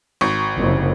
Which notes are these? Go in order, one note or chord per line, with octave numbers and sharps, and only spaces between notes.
G#1 C#6
F#1 F2 C3